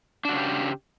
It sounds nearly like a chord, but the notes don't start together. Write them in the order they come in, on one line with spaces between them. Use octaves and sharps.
D4 F#4 C#3 G4